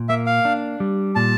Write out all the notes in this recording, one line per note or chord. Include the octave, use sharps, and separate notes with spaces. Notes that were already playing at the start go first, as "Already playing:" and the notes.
Already playing: A#2
A#3 E5
F5
D4
G3
A#2 A5